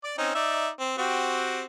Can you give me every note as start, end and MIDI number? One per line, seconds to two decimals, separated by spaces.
0.04 0.13 74
0.04 0.13 86
0.18 0.34 60
0.18 0.34 61
0.18 0.34 63
0.35 0.69 63
0.35 0.69 74
0.35 0.69 76
0.79 0.96 60
0.98 1.64 60
0.98 1.64 66
0.98 1.64 67